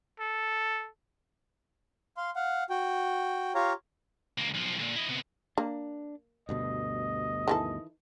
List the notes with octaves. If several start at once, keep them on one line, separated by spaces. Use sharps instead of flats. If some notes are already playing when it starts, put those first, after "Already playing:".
A4
F5 C6
F5 F#5
F#4 G5
F4 G4 C#5 F5 A#5
C#2 A#3
B1 F3
A#2 D3
E4 D#5
C3 B3
A#3 D4
D2 G2 B2 D#5
D#3 E3 A4